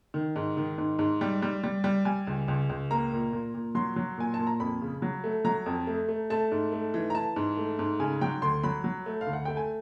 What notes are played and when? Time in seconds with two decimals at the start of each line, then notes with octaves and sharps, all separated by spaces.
0.14 D#3
0.36 G#2
0.57 D#3
0.78 G#2
0.99 G#2
1.21 G3
1.42 G3
1.63 G3
1.84 G3
2.05 G3 G#5
2.27 C#2
2.48 C#2
2.69 C#2
2.91 A#3 A#5
3.12 A#2
3.33 A#2
3.54 A#2
3.75 F#3 C6
3.96 F#3
4.18 A#2 G#5
4.34 A5
4.39 A#2
4.47 A#5
4.60 F2 B5
4.82 C#3
5.02 F#3
5.24 A3
5.45 F#3 A#5
5.66 F2
5.87 A3
6.08 A3
6.30 A3 A5
6.52 G#2
6.72 A3
6.94 E3
7.10 A#5
7.15 E3 A5
7.36 G#2
7.57 A3
7.79 G#2
8.00 C#3 G#5
8.21 F#3 G5
8.42 D2 C6
8.64 F#3 B5
8.84 F#3
9.06 A3
9.21 F5
9.27 D2
9.33 F#5
9.45 A3 G5
9.57 G#5